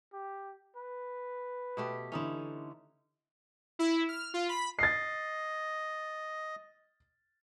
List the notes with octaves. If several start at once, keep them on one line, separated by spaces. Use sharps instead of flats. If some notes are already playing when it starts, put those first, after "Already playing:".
G4
B4
B2 A3 G4
D3 E3 C#4 D#4 E4
E4
F6
F4
B5
D#5 A6 C7